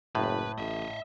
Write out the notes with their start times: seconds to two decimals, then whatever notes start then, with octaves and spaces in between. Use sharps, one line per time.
0.15 F#1 A2 B4
0.58 A1 D#5 E5